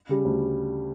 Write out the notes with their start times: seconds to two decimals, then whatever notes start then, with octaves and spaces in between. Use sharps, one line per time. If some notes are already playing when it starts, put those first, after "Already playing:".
0.09 C#3 G3
0.25 D2